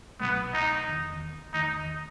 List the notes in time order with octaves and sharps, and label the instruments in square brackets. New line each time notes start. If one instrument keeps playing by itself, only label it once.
[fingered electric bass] C2 B2 F#3 A3 [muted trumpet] B3
[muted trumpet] D#4
[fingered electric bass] E1 E2 D#3
[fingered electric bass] E2 D#3 A3 [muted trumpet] D#4